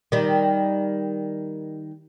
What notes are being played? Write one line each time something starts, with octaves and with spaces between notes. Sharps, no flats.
D#3 G3